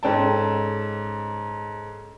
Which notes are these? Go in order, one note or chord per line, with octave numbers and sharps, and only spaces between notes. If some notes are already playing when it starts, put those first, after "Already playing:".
G#2 C#4 A4 G5 A5